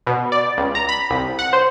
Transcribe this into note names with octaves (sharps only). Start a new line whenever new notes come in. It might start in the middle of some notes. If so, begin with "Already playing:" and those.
B2
D5
C#2
A#5
B5
C2
F#5
C5